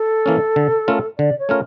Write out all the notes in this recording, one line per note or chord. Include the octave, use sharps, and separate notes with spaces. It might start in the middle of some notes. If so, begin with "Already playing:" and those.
Already playing: A4
E3 A#3 C#4
D3
A3 C#4 F4 A#4
D3 D5
C#5
A3 C#4 F4 A#4